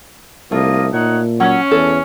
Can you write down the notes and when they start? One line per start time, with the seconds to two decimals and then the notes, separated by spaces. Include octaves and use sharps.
0.52 C2 A3 A#3 F4 D#5
0.93 A#2 D#4 C#5 F#5
1.40 F#3 C#4
1.71 E2 A4